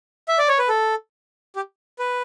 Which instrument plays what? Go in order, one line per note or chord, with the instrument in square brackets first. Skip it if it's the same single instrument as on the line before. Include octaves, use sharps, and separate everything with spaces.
[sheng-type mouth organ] E5
D5
C#5
B4
A4
G4
B4